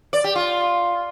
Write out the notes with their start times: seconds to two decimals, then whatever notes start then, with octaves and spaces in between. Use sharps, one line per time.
0.13 D5
0.24 G4
0.35 F4